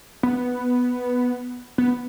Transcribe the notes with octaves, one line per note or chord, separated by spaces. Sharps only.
B3
B3